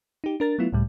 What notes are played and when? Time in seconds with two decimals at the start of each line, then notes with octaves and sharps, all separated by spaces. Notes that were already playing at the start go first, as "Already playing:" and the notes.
0.24 D#4 G4
0.40 D4 A#4 A6
0.59 F#3 A3 B3 E4 F4
0.73 C#2 A2 G3